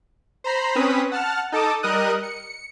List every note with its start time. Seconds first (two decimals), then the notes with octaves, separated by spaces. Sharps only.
0.44 C5 A#5 B5 C7
0.75 C4 C#4 B4 D#6 B6
1.12 F#5 A5 F6
1.52 D#4 A4 A5 D6 D#6
1.83 G3 A#4 D#5 D#6 F#6 D#7
2.23 C#7